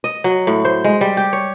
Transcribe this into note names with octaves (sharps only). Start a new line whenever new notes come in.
D#5
F#3
A2
C5
G#3
G3
G4
C#5